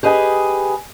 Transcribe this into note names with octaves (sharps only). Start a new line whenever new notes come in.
G4 G#4 B4 D#5 G5 G#5